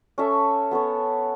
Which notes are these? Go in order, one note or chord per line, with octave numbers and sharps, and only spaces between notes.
C#4 A4 E5
B3 A4 C#5